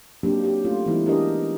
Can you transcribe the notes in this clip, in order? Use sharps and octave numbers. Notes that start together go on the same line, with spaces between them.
F#3 A#3 C4 D4 D#4 G4
G4
A3 C#4 F4
E3 G3 G#3 B3 D#4 E4
D4 D#4 G4 G#4 A#4 D#5